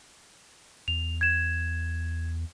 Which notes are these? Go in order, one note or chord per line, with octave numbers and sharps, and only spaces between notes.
E2 F7
G#6 E7